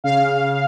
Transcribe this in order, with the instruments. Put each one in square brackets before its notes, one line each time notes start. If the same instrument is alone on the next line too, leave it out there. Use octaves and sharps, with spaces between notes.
[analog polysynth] C#3 F5